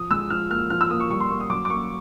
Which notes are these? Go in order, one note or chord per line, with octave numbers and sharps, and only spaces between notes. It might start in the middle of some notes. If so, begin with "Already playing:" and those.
Already playing: F3 D#6
G#3 E6
F3 F6
A#3 F6
F3 F6
E6
A#3 D#6
C#6
G3 C#6
C6
A#3 C#6
D#6
F#3 D6
D6
A#3 C#6